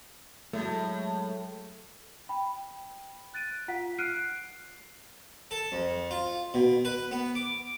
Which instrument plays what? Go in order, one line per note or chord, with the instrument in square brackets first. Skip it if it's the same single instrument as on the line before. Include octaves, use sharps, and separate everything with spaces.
[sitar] A2 [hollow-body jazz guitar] F#3 G#3 A3
[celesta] G5 B5
F#6 A6 D7 D#7
F4 F5 F#5 B6
F6 F#6 C7 D7 D#7
[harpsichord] A4
F2
F4
B2
B4
B3
D6